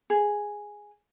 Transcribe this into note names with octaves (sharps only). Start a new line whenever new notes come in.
G#4